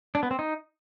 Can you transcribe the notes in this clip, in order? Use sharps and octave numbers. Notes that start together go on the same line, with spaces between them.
D4
B3
C4
D#4